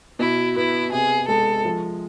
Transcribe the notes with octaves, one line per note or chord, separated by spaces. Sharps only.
B2 E4
B3 E4
C3 G#4
G#3 A4
F3